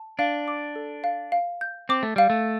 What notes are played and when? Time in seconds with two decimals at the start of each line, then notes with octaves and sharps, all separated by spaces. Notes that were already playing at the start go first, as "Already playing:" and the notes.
Already playing: A5
0.19 D4 F5
0.48 D6
0.76 A4
1.04 F5
1.32 F5
1.61 G6
1.89 C4 D6
2.03 A3
2.16 G3 F5
2.30 A3